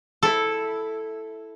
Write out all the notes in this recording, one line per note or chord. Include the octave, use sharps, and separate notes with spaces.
E4 A4